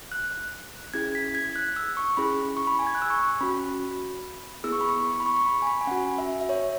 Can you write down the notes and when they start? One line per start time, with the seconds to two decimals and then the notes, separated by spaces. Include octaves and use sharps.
0.12 F#6
0.94 C#4 E4 G#4 G#6
1.15 B6
1.35 G#6
1.56 F#6
1.76 E6
1.97 C#6
2.17 C#4 E4 G#4 B5
2.57 C#6
2.67 B5
2.79 G#5
2.87 G#6
2.95 F#6
3.02 E6
3.10 C#6
3.41 C#4 F#4 B5
4.64 B3 E4 G#4 E6
4.72 C#6
4.81 B5
4.89 C#6
5.20 B5
5.26 C#6
5.37 C#6
5.46 B5
5.62 G#5
5.67 B5
5.81 G#5
5.87 C#4 F#4 F#5
6.18 E5
6.41 E5
6.49 C#5